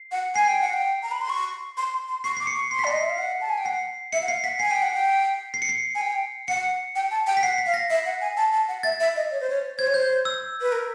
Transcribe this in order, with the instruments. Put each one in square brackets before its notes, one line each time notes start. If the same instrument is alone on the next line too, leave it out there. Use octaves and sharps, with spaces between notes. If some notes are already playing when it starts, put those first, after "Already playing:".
Already playing: [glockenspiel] C7
[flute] F#5
[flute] G#5 [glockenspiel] C7
[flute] G5
F#5
G5
A#5
B5
C6
C#6
C6
C6
C6
[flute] C#6 [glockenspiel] C7
[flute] D6 [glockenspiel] C7
[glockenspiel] C#7
[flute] C#6
[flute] C6 [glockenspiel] C7
[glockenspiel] B6
[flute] D5 [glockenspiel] C7
[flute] D#5
E5
F5
F#5
A5
G#5
G5
[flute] F#5 [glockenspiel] C7
[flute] E5 [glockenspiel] C#7
[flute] F#5
[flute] F5 [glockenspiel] C7
[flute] F#5 [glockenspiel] B6
[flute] G#5 [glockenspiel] C7
[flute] G5
F#5
G5
[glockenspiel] C7
C#7
C7
[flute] G#5
G5
[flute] F#5 [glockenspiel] C#7
[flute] G5
A5
G5
[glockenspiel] B6
[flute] F#5 [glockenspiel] C7
[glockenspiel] B6
[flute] F5
[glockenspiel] A#6
[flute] E5
F#5
G#5
A5
A5
F#5
[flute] E5 [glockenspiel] A6
[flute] E5
D#5
C#5
C5
C#5
[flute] C5 [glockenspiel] G#6
[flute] C#5
[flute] C5 [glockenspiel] G6
[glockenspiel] E6
[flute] B4
A#4